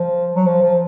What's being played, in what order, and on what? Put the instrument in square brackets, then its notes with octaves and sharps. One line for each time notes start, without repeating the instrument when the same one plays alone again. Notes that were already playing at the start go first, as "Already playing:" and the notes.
Already playing: [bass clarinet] F3
F#3
F3
F3